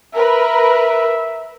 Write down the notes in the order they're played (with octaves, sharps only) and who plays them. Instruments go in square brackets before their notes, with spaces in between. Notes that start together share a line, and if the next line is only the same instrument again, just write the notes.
[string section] A#4 B4 [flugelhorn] E5